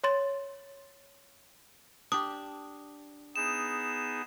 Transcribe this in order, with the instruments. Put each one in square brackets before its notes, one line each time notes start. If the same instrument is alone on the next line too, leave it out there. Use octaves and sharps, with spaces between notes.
[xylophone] C#5 C6 A6
[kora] D4 G4 [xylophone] D#6
[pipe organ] B3 D#4 G#4 [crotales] E7